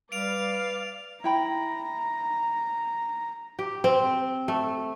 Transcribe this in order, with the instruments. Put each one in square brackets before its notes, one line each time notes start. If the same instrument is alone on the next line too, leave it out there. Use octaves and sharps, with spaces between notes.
[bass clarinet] G3 [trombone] B4 [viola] D5 F5 [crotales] D7 F7
[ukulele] E4 G5 B5 [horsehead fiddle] A#5
[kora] G4
C4
A3